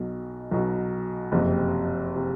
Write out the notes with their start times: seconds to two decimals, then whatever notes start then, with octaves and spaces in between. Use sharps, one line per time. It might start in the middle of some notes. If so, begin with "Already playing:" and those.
Already playing: B1 B2 F#3
0.51 B1 B2 F#3
1.32 F#1 F2 C3
2.16 C3